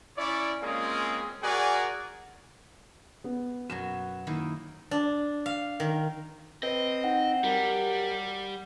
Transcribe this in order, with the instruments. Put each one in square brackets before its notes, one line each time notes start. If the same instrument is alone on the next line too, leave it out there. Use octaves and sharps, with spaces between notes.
[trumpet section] C#4 E4 C#5 D5
G#3 A#3 C4 C#4 F4 G#4
F#4 G#4 A#4 D5 F#5 G#5
[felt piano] B3
[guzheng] F#2 B2 F#3 [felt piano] E7
[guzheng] D#3 A#3 E4
[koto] D4
F5
D#3
[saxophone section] C4 [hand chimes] B4 C5 [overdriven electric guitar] D#5
[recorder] D#4 [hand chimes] F#5 G5
[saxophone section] F#3 G4 [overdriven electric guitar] G3 [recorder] A#4